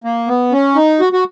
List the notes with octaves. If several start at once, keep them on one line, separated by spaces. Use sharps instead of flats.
A#3
B3
C#4
D#4
F#4
F#4